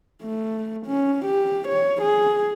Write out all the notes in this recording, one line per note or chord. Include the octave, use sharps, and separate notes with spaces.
A3
C#4
G4
C#5
G#4